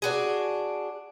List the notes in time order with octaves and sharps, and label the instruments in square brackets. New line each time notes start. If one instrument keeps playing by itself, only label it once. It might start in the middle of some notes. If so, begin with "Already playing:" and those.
[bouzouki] D4 F#4 G#4